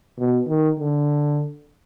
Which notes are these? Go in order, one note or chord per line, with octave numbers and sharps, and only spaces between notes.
B2
D#3
D3